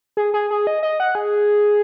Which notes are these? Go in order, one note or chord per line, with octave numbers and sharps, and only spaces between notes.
G#4
G#4
G#4
D#5
D#5
F#5
G#4